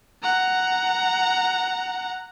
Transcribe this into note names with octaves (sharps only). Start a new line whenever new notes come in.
F#5 A#5